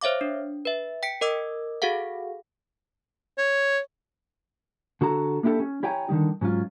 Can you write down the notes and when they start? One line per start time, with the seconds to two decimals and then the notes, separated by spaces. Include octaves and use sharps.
0.01 C5 C#5 E5 F5 D6
0.21 D4
0.65 B4 E5
1.03 G5 B6 C#7 D7
1.21 A#4 D#5 D6 E6
1.82 F#4 G#4 A4 F5 F#5
3.38 C#5
5.01 D3 F#4 A4 A#5
5.43 A#3 D4 E4 G4 A4
5.60 C#4
5.83 E4 G4 C#5 G5 G#5 A#5
6.09 D3 D#3 G3 D#4
6.41 G#2 F#3 C#4 F4